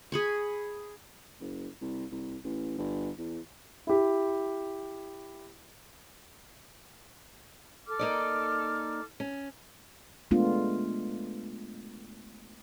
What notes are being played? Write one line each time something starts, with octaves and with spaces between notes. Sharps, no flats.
G#4 B5 C#6
F#1
C2
C2
A1
G1
E2
E4 G4
A4 D6 F6
A#3 D#4 D5
C#4
G#3 A3 B3 D4 F4